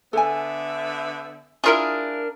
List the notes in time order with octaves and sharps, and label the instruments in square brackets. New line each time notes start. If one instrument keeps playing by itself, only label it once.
[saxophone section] D3 B3 E5 [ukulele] A4 G#5
[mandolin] D4 A#4 [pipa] E4 F4 G#4